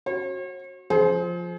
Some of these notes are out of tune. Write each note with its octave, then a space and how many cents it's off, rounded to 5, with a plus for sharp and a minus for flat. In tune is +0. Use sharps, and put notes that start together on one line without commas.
F#4 -5 C#5 -45
F3 +5 G#4 +40 C5 +0